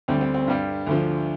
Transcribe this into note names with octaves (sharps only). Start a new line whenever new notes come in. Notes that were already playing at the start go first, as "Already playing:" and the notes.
D2 D3 G3 C4
C4
C4
G2 G3
D2 D3 F3